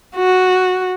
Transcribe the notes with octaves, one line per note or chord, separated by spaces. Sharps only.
F#4